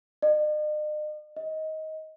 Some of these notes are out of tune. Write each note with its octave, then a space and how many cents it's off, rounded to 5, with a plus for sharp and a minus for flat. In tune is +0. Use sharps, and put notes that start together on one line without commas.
D#5 -45
D#5 +15